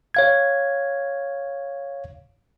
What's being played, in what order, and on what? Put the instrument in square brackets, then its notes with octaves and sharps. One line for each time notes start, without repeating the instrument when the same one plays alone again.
[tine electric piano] C#5 F5 G#6